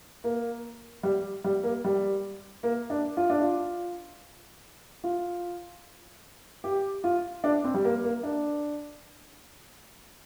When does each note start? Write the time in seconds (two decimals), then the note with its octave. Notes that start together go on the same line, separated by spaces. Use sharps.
0.24 A#3
1.03 G3
1.44 G3
1.63 A#3
1.84 G3
2.63 A#3
2.90 D4
3.17 F4
3.30 D4
3.41 F4
5.04 F4
6.64 G4
7.04 F4
7.44 D4
7.64 C4
7.74 G3
7.85 A#3
8.04 A#3
8.23 D4